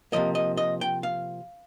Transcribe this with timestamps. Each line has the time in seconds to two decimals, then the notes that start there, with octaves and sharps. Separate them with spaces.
0.12 C3 F3 A#3 D#5
0.35 D#5
0.57 D#5
0.81 G5
1.03 F5